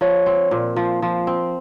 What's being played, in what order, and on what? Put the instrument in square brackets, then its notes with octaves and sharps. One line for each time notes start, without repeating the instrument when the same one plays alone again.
[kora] F3 [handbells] C#5
[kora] C4
A#2
F3
F3
C4